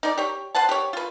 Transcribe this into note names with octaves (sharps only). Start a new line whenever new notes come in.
D#4 D5
G4 C#5
B4 C5 F#5 A5
G4 C#5
F4 B4